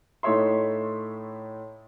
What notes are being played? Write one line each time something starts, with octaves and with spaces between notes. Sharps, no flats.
A2 A3 D#4 C#5 E5 C6